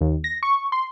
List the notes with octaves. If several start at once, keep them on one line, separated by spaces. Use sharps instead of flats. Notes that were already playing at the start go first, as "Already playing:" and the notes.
D#2
A#6
C#6
C6